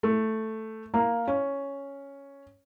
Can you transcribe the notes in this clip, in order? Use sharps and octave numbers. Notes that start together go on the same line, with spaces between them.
A3
A#3
C#4